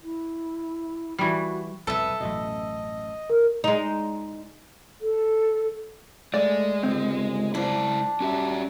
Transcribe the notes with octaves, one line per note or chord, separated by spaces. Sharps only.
E4
E3 G3 F#4
F1 C2 B2 A4 B4 E5 D#6
A1 F#2 B2 D#5
A#4
G#3 D#4
A4
G#3 A3 D5
G1 C#2 C4
D4 E4 C5
G3 C#4 F#4 E5